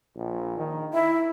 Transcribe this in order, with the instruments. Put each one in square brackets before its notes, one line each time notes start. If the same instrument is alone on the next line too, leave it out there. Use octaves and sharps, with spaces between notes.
[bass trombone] A#1
D#3
[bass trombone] E4 [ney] E5